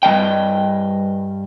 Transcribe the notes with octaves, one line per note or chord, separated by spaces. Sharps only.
G2 G#3 D#5 G5